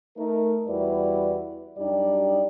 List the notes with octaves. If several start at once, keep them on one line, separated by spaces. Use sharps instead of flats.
A3 D#4 A#4
E2 G3 E4 F#4 B4 D5
F#2 G3 D4 D#4 G4 D5